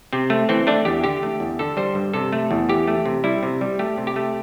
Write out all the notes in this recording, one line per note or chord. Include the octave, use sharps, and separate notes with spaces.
C3 C4
A3
E3 C4
A3 D4
E2 G4
D3 G4
A3
E2
D3 A4
G3 C5
G2
C3 A4
A3
E2
E3 G4
A3
C3
G3 E4
C3
G3
A3 G4
C3
G4
A3